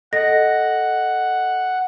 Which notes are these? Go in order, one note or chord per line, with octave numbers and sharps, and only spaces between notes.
A4 D#5 F#5 A#6